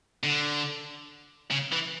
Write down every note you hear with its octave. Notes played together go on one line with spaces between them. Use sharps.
D3
C#3
E3